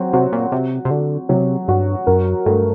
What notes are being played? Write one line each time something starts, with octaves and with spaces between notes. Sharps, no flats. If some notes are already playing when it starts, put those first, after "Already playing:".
Already playing: F#3 C4 F#4
C3 F#4
A#2
C3 F#4
C3
D3 F#4
C3 F#3
G2 F#4
F#2 A#4
G2 A3